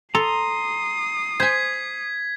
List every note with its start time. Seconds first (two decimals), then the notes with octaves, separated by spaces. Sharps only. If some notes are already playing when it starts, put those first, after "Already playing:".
0.15 A4 A#5 C6 D#6 C7
1.40 C5 G#5 G#6 B6